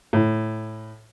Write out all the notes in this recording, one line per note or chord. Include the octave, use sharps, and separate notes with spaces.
A2